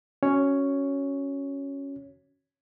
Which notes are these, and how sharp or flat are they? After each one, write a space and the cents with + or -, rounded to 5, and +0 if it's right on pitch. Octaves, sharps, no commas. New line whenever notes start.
C#4 +0 F#4 +0 C#5 +5